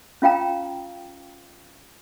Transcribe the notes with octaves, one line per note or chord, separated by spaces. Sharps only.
C#4 F4 F5 G5 A#5